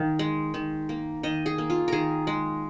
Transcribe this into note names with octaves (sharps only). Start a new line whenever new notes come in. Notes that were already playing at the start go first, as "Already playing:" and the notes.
Already playing: D#3 F5
G#3
D#3
A#3
D#3 D#5
G#4
A#3
F4
D#3 G#4 A#4
G#3